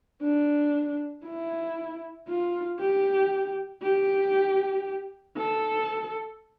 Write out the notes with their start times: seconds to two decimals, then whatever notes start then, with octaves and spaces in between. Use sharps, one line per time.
0.22 D4
1.24 E4
2.28 F4
2.79 G4
3.82 G4
5.37 A4